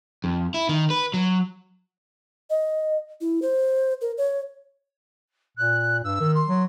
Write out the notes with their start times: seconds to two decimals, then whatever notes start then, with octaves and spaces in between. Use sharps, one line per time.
0.24 F2
0.54 E4
0.69 D#3
0.90 B4
1.14 F#3
2.50 D#5
3.21 E4
3.42 C5
4.01 A#4
4.18 C#5
5.57 A#2 F#6
6.04 G2 E6
6.21 D#3
6.34 C6
6.48 F#3